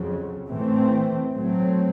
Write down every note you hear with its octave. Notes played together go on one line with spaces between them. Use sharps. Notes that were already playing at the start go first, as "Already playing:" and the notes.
Already playing: F2 C#3 F#3
A2 E3 A3 C4
A2 F#3 A3 C4